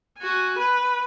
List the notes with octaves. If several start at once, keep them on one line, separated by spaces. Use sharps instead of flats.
F#4 G#5
B4